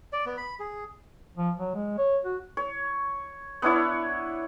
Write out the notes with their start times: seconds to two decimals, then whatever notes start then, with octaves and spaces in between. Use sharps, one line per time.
0.13 D5
0.26 B3
0.37 B5
0.60 G#4
1.38 F3
1.58 F#3
1.75 G#3
1.98 C#5
2.24 F#4
2.57 C#5
3.62 B3 D4 E4 C#5